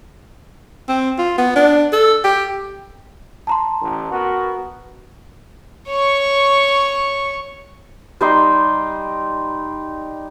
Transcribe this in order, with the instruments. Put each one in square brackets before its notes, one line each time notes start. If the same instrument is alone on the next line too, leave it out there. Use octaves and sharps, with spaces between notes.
[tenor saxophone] C4
F4
B3
D4
A4
G4
[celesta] A5 A#5 C6
[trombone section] A1
B3 F#4 A#4
[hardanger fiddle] C#5 C#6
[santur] G3 D#4 C6